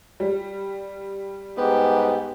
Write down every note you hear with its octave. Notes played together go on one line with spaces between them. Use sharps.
G3
G#2 B3 G4